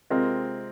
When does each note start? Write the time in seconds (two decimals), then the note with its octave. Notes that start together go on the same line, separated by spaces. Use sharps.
0.10 C3 G#3 C4 F4 A#4